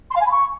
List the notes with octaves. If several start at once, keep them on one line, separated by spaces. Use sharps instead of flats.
C6
F5
G#5
B5
C#6